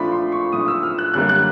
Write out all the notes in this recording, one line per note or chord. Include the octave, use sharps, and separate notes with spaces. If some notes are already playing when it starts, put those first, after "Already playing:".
Already playing: A#2 F3 A3 D4 B5
C6
C#6
A#2 F3 A3 D4 D#6
E6
F6
F#6
F#2 D3 G3 A#3 F#6
F#6